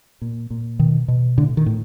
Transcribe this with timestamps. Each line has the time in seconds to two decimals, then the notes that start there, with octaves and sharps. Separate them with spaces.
0.22 A#2
0.50 A#2
0.79 B2 D#3
1.08 B2
1.37 A2 D3
1.57 D#3
1.66 A2